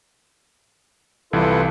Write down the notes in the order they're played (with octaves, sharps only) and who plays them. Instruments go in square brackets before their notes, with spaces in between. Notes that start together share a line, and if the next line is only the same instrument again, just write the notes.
[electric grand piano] C2 E3 [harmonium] F4 A4 B4